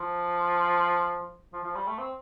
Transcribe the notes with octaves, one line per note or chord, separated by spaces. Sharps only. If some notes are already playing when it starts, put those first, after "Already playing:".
Already playing: F3
F3
F3
G3
A3
C4